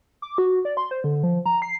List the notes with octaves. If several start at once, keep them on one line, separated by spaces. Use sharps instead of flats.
D6
F#4
D5
C6
C5
D3
F3
A#5
C7